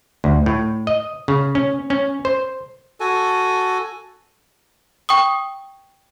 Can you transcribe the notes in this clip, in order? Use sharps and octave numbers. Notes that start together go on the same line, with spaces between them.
D2
A2
D#5
C#3
C#4
C#4
C5
F#4 A4 G#5
G5 C#6 D#6